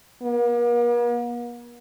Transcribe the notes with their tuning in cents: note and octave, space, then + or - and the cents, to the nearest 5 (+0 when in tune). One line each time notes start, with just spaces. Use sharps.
A#3 +45